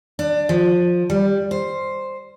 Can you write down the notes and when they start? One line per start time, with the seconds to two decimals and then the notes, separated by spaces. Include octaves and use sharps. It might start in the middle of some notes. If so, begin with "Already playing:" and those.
0.19 D4
0.49 F3
1.10 G3
1.51 C5